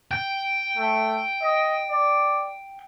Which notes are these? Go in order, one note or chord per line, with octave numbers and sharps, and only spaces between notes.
G5
A3
D#5
D5